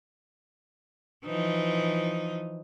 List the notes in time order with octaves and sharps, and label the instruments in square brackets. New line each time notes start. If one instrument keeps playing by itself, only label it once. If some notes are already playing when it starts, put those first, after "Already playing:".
[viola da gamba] E3 F3 D#4